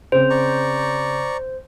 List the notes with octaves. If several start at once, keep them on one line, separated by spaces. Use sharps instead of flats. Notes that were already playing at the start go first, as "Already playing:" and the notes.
C#3 C4 C5
D5 A#5 C#6